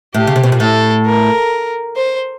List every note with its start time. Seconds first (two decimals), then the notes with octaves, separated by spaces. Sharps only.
0.14 A2 G4
0.27 C#3
0.36 C3
0.44 B2
0.52 A#2
0.60 A2 A4
1.06 A#4
1.97 C5